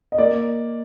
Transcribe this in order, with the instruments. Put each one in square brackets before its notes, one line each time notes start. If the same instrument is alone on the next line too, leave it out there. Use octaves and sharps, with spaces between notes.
[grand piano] D#5
[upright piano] A#3 [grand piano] D5